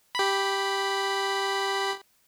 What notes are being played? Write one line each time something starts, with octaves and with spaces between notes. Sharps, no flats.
G4 B5